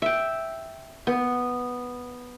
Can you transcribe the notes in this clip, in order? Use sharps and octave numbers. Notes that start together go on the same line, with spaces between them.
E5 G5
B3